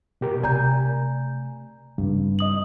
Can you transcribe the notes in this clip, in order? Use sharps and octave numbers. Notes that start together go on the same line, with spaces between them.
B2 G4 A#4
C3 A3 D5 G#5 A#5 G6
G2 C#3 C4
D#5 D#6 F#7